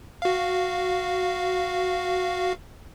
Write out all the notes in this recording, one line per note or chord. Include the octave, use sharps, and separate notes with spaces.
F#4 F5